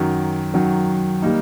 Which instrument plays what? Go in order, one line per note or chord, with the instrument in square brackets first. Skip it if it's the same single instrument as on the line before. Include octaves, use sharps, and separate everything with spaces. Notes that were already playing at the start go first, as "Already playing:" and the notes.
Already playing: [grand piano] F#2 D#3 F#3
F#2 D#3 F#3
D#3 G3 A#3 D#4